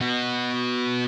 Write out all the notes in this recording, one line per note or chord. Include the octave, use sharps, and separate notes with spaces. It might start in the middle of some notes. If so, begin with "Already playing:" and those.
B3 F#4